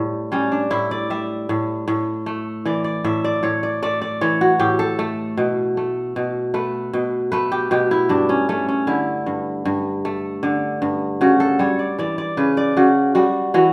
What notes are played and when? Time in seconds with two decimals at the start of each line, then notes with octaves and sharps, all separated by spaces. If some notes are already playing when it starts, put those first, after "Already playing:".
Already playing: A2 G3
0.32 G3 C#4
0.52 D4
0.71 A2 E4
0.91 D5
1.10 G3 E5
1.49 A2
1.88 A2
2.26 A3
2.65 E3 D5
2.84 D5
3.04 A2 E5
3.24 D5
3.43 A2 C#5
3.63 D5
3.82 A3 D5
4.02 D5
4.21 E3 C#5
4.41 F#4
4.59 A2 G4
4.79 A4
4.99 A3
5.37 B2
5.77 A3
6.16 B2
6.54 A3 B4
6.93 B2
7.32 A3 B4
7.52 G4
7.71 B2 G4
7.91 E4
8.09 G2 D4
8.29 C#4
8.49 A3 C#4
8.69 C#4
8.87 D3 E4
9.26 G2
9.65 G2
10.05 A3
10.43 D3
10.82 G2
11.21 C#3 F#4
11.40 A4
11.59 G3 C#5
11.79 D5
11.98 E3 D5
12.18 D5
12.37 C#3 B4
12.57 D5
12.77 C#3 F#4
13.15 G3 F#4
13.54 E3 F#4